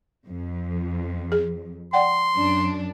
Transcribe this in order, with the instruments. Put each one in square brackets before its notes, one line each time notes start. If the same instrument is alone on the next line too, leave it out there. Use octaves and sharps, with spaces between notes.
[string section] F2
[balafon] G#4
[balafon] D5 F#5 G5 [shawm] C6
[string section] F#2 D4